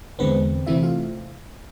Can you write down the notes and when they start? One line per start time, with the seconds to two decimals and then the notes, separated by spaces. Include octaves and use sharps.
0.19 E2 D3 G#3 B3 C4 B4
0.66 C3 E3 A3 C4 E4 E5
0.83 F4 F5